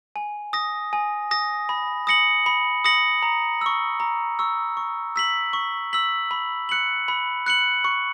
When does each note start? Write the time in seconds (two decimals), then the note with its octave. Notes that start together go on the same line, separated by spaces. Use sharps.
0.16 G#5
0.53 D#6 A#6
0.93 G#5
1.31 D#6 A#6
1.69 B5
2.07 D#6 A#6 C#7 F#7
2.46 B5
2.85 D#6 A#6 C#7 F#7
3.22 A#5
3.61 C#6 E6
4.00 A#5
4.39 C#6 E6
4.77 C#6
5.16 E6 B6 F#7
5.53 C#6
5.93 E6 B6 F#7
6.31 B5
6.69 F#6 C#7 F#7
7.08 B5
7.46 F#6 C#7 F#7
7.84 C#6